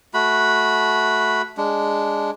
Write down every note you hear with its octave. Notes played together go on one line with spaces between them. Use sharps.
A3 F#4 B5
G#3 D4